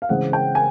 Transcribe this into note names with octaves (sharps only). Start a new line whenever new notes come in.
F5
C#3 E3 G#3 C4 F#5
G5
G#5